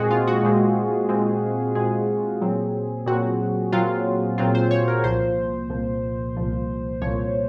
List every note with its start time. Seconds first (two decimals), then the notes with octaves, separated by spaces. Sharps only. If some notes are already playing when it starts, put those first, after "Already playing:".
Already playing: A#2 G#3 C4 F#4 G#4
0.11 F4
0.28 F#4
0.43 A#2 G#3 C4
1.09 A#2 G#3 C4
1.75 A#2 G#3 C4 G#4
2.42 A#2 F#3 C4
3.06 A#2 F#3 C4 F#4
3.72 A#2 F#3 C4 F4
4.38 A#2 F#3 C4 F4
4.55 C5
4.71 C#5
4.88 A#4
5.04 C2 A#2 F3 C5
5.70 C2 A#2 F3
6.37 C2 A#2 F3
7.02 C2 A#2 F3 C#5